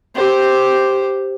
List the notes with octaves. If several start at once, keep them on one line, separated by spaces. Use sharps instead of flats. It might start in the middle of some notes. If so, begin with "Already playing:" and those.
G4 C5